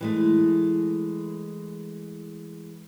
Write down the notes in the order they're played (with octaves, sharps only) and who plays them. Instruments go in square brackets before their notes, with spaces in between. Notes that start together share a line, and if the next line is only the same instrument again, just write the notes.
[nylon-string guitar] E3 G#3 A3